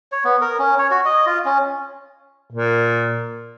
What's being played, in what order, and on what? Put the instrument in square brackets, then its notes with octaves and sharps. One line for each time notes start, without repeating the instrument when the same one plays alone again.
[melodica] C#5
B3
A#4
C#4
C#5
F#4
D#5
F4
C#4
[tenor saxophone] A#2